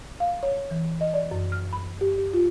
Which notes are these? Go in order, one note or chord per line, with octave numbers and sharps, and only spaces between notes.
F5
C#5
E3
D#5
D5
F#2
F6
B5
G4
G4
F4